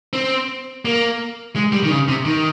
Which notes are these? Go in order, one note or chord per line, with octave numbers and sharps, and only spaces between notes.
C4
A#3
G#3
G3
D#3
C#3
C3
D#3